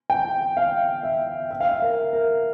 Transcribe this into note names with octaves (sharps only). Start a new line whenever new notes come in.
G5
F5
E5
E5
F5
E5
A#4
A#4